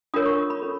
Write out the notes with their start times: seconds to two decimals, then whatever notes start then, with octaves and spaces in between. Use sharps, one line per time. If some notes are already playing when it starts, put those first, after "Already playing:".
0.14 D4 F4 A#4 C#5 D#6
0.26 C#6
0.50 B5
0.62 C#4 F4 A4 C#5